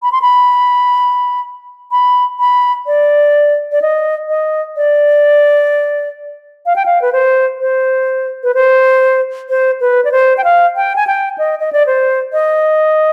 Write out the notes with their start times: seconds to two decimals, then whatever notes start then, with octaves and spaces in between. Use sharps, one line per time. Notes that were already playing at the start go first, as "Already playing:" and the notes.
0.03 B5
0.12 C6
0.22 B5
1.91 B5
2.40 B5
2.87 D5
3.72 D5
3.82 D#5
4.28 D#5
4.77 D5
6.66 F5
6.76 G5
6.86 F5
7.02 B4
7.13 C5
7.61 C5
8.43 B4
8.55 C5
9.49 C5
9.81 B4
10.05 D5
10.12 C5
10.38 G5
10.44 F5
10.76 G5
10.96 G#5
11.07 G5
11.38 D#5
11.59 D#5
11.73 D5
11.87 C5
12.33 D#5